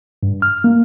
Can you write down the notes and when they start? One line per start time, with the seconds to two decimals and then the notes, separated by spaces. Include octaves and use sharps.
0.23 G2
0.42 F6
0.64 A#3